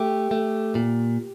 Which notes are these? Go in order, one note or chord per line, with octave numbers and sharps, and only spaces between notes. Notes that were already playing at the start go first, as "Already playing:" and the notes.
Already playing: A3 G4
A3
A#2